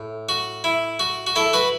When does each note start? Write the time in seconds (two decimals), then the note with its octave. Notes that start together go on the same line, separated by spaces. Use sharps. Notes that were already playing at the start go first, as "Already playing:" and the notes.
Already playing: A2
0.29 F#4
0.64 E4
0.99 F#4
1.27 F#4
1.36 E4 A4
1.53 F#4 B4